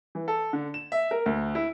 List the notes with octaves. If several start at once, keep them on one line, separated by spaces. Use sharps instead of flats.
E3
A4
D3
E7
E5
A#4
D2
E4